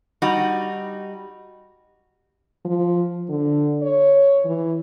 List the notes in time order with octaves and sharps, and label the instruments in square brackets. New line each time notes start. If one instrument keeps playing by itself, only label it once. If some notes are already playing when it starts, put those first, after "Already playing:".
[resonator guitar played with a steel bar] G3 D#4 F#4
[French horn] F3
D3
C#5
E3